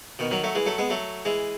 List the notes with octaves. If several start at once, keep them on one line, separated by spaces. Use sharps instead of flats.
B2 D#3
D#3 F#3
F#3 A3
E3 G#3
F#3 A3
G#3 B3
F#3 A3
E3 G#3